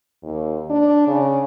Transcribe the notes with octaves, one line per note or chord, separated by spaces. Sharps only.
D#2
D4
C#3